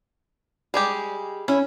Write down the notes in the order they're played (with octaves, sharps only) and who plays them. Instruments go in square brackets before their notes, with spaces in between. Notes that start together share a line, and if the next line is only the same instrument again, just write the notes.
[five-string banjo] G3 G#3 G4 [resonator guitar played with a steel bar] G#4
[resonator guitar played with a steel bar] C#4 [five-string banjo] E4